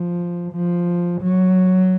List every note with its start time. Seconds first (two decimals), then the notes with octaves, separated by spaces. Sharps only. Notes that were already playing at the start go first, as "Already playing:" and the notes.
Already playing: F3
0.53 F3
1.22 F#3